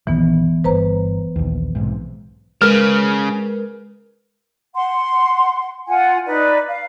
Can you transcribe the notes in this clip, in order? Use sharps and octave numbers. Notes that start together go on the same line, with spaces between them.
A#1 F#2 D#3 E3 B3
G1 B4 C5 A#5
A#1 D#2
B1 G#2 C3
C#3 G#3 A#4 B4 F6
F#5 C6
F4 F#5 G#5
D#4 B4 D5
F5